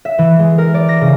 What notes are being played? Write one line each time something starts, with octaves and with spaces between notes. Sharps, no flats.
E5
E3
G#3
A#4
D5
A#6
C#3